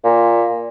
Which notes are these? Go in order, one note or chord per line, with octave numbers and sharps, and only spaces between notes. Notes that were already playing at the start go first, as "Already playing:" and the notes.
A#2